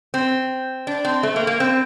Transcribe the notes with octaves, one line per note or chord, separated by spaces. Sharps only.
C4
D4
C4
A3
A#3
A#3
C4